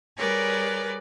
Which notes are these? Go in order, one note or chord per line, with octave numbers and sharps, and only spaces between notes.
G3 G#4 A#4 B4 C#5 D5